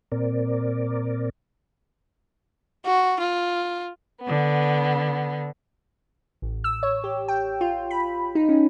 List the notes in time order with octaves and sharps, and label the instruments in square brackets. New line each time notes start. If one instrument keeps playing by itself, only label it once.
[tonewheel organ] A#2 C4 A#4 D5
[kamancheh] F#4
F4
[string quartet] D3 B3
[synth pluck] A1
E6
C#5
G4
G5
F4
B5
D#4
C#4